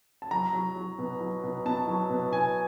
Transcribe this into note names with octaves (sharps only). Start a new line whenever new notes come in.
A5
F#3 A#5
F#3
F#3
B2
F#3
B2
B2 A5
F#3
B2
B2 G#5